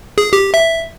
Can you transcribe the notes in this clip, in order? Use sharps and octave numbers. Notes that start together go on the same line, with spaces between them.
G#4
G4
E5